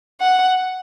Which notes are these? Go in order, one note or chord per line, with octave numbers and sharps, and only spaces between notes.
F#5